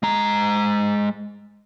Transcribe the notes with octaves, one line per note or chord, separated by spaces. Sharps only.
G#3 A#5